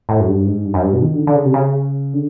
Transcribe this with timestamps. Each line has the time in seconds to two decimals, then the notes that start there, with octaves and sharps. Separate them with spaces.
0.09 A2
0.20 F#2
0.28 G2
0.46 G#2
0.65 G2
0.74 F#2
0.83 G2
0.93 B2
1.02 D#3
1.15 D3
1.27 D3
1.36 C#3
1.45 C3
1.54 C#3
2.13 D3